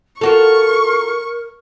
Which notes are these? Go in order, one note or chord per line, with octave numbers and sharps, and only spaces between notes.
F4 F#4 A4 A#4 C#6